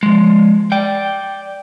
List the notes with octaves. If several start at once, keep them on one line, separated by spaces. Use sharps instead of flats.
F3 G#3
D5 G5